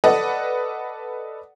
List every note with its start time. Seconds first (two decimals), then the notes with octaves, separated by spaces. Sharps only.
0.04 A4 B4 D5 D#5 F#5